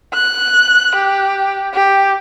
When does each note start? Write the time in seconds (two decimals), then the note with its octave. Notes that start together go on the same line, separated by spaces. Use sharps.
0.14 F#6
0.95 G4
1.74 G4